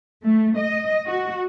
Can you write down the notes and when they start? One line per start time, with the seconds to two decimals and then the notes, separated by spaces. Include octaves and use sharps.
0.23 A3
0.57 D#5
1.07 F#4